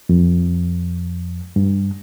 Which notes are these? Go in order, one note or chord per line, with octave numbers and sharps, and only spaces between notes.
F2
G2